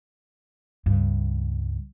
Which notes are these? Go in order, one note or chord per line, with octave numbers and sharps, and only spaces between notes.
C#2 G2